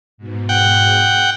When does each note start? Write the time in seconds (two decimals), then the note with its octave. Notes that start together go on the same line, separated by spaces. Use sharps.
0.18 G#2 B2
0.49 F#5 G5